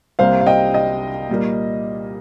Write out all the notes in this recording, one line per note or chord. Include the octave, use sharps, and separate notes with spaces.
C2 C3 G3 A#3 C5 F5
F5
D#5 G5
D#5
A#2 G3 A#3